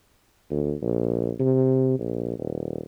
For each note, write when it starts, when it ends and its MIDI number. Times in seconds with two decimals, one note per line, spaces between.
0.50 0.74 38
0.82 1.31 34
1.39 1.95 48
1.99 2.35 34
2.39 2.80 27